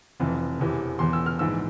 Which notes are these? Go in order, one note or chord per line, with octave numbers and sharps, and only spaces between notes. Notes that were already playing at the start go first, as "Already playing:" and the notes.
F1 F2 E3
E1 E2 C3 E3
E1 E2 E3 C6
E6
F6
A#1 G#2 E3 E6